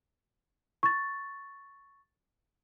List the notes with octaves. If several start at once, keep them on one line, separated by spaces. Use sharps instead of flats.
C#6 A6